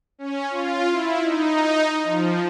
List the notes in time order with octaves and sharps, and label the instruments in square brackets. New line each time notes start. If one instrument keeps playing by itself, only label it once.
[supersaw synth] C#4
F4
E4
D#4
F3